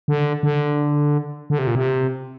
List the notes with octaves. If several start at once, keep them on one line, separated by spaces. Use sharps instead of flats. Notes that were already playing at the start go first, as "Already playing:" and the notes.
D3
D3
D3
C3
A#2
C3